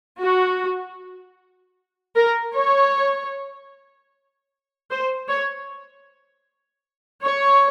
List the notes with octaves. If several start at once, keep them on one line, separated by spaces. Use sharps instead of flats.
F#4
A#4
C#5
C5
C#5
C#5